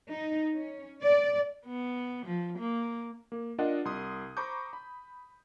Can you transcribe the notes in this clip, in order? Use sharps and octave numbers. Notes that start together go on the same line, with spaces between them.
D#4
C#4
D5
B3
F3
A#3
A#3
D4 F4 A#4 D5 D#5 F#5
C2 C6 D#6
C5 A#5 B5 C#6 D6 G6
B5